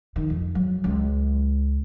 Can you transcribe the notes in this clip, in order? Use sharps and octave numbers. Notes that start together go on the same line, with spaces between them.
D#3
F2
F#3
C#2